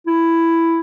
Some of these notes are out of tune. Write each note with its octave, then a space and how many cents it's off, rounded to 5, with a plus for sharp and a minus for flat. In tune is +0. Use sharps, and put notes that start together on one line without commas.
E4 +5